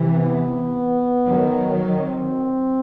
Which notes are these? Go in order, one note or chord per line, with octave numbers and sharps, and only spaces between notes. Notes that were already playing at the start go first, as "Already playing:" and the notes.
Already playing: C3 E3
B3
D#3 F#3
C4